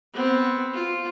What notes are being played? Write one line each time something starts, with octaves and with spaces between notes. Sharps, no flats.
B3 C4
F4